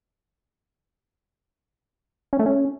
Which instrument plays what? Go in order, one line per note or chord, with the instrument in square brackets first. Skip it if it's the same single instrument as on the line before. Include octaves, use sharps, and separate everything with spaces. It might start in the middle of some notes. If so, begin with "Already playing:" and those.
[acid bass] C#4
A3
C#4